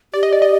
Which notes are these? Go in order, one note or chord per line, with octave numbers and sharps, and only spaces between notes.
G4 D5
D#5
D5
D#5